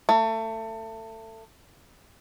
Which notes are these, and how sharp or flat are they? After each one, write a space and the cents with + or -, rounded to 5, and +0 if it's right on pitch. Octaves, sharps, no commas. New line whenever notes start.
A3 +25